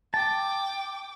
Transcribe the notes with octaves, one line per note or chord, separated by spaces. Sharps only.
G5 A5 D6